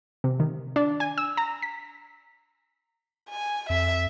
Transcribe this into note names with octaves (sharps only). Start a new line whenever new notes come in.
C3
D#3
D4
G#5
E6
A#5
B6
G#5
F2 E5